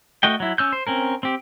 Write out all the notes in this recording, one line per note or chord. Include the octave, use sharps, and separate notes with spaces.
A3 F#4 D#5 G5
F#3 E4
C#4 E6 G6
C5
C4 C#4 A#4
C4 G4